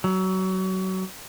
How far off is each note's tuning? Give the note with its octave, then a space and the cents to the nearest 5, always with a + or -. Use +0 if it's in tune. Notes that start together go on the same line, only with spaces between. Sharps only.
F#3 +25